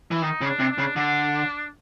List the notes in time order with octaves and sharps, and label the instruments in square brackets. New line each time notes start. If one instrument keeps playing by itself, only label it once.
[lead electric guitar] E3
[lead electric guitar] D#3 [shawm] D#4
[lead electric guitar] C#3
[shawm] D4
[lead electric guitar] C3
[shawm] D4
[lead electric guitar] C#3
[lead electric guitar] D3 [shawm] D4